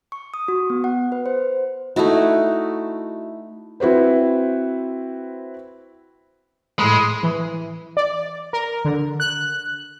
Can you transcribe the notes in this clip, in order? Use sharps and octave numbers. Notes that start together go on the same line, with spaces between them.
C#6
D#6
F#4
B3
F#5
B4
C5
A3 D#4 E4 F#4
C4 E4 F#4 B4 C5
A2 G#3 B5
E3
D5
A#4
D3
F#6